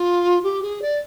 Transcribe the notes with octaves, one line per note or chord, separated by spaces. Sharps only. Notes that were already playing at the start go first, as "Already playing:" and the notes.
Already playing: F4
G4
G#4
D5